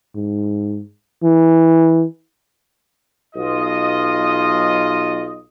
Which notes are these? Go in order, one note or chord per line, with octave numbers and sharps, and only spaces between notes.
G#2
E3
B1 F4 D#5